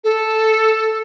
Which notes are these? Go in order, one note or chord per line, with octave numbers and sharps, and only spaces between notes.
A4